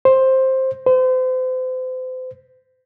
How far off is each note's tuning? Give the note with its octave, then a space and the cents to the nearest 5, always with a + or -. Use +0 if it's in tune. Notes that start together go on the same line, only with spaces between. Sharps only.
C5 +10
C5 -35